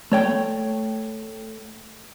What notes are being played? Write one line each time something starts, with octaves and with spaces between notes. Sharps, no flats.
A3 C#5 G5